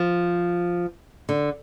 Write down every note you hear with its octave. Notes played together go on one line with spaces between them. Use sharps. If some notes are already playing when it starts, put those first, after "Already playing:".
Already playing: F3
D3